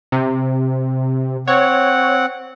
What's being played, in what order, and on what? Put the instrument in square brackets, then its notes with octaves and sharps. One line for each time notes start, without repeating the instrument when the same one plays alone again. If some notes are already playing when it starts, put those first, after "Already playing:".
[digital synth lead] C3
[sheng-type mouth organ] C4 F#5 [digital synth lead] C#5